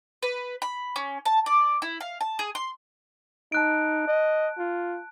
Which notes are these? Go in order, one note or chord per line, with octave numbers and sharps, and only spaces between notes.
B4
B5
C#4
A5
D5
E4
F5
A5
G#4
C6
D#4 A5 F#6 D7
D#5
F4